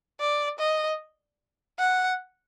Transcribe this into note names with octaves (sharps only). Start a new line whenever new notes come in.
D5
D#5
F#5